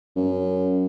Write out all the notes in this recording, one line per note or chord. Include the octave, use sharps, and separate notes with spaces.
F#2